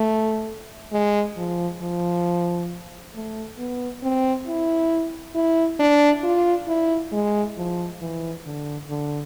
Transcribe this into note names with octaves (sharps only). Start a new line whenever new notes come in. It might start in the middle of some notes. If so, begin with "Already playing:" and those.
Already playing: A3
G#3
F3
F3
A3
B3
C4
E4
E4
D4
F4
E4
G#3
F3
E3
D3
D3